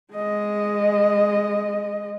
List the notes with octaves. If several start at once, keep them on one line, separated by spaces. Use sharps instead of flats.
G#3 D#5